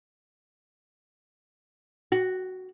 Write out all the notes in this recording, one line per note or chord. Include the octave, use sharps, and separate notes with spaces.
F#4